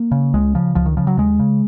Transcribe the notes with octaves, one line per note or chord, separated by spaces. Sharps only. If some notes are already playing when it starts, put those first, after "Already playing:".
Already playing: A#3
C#3
C#2 G#3
C#3 F3
C#2 F3
D#3
C#3 F3
F#3
D#2 G#3
C#3